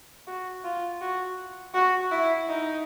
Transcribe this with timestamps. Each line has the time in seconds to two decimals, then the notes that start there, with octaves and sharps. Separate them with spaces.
0.27 F#4
0.64 F4
1.01 F#4
1.74 F#4
2.12 E4
2.48 D#4